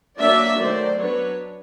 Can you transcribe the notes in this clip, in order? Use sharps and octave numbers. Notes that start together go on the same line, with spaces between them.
F#3 A#3 D4 D5 E5
D#3 F#3 A3 C5 D5
F#3 B3 D4 B4 C#5